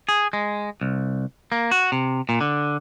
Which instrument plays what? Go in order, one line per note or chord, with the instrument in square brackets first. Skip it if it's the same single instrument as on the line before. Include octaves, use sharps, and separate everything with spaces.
[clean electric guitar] G#4
G#3
C2
A#3
F#4
C3
A#2
D3